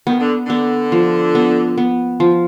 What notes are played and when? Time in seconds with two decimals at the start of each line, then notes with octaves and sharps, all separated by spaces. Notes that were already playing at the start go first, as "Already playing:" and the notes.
0.07 D#3 B3
0.20 D3
0.47 D3 B3
0.92 F3
1.35 B3
1.78 B3
2.20 F3